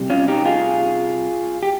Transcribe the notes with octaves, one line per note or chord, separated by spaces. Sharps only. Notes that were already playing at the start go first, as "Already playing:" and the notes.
Already playing: C3 G3
C#4 F4
D#4 G4
F4 G#4
G4